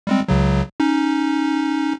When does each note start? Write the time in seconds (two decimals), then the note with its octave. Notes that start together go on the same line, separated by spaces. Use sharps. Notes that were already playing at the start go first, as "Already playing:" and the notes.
0.07 G3 G#3 C4
0.28 C#2 C#3 F#3
0.80 C#4 D#4